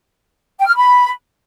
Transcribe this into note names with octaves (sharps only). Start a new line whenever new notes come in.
G5
F6
B5